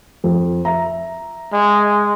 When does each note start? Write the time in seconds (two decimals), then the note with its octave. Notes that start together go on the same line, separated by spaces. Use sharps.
0.24 F2
0.65 E5 A#5
1.53 G#3